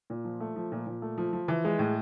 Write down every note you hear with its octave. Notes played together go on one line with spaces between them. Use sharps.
A#2
F3
A3
F3
A#2
A#2
A3
F3
F3
E3
G#3
A2